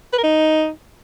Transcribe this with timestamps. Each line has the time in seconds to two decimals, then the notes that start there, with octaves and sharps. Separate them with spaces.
0.13 B4
0.18 A#4
0.24 D#4